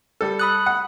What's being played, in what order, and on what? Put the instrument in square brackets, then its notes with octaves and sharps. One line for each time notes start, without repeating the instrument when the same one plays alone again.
[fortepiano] G3 A4
[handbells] B5 D#6 F#6
[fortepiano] F#5